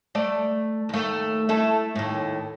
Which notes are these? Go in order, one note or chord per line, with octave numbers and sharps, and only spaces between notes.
A3 D5
D#2 A3
A3 E4 A4
D#2 A2